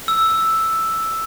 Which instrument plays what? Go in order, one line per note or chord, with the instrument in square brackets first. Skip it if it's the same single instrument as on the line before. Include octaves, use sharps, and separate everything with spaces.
[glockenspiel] E6